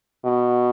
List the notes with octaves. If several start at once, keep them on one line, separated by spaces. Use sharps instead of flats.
B2